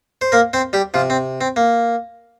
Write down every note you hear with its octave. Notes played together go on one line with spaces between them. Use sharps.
C5
A#3 A#4
C4 C5
G3 G4
C3 F3 F4
C4
C4
A#3